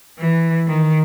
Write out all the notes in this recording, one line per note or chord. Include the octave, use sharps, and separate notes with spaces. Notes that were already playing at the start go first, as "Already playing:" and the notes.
E3
D#3